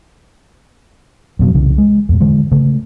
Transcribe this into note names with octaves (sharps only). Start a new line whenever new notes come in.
F2 B2 F#3
C2 C#3 E3
G#3
E2 A2
D3 E3 G#3
C#3 A3